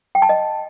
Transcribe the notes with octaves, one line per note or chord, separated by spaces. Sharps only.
G5
A5
D#5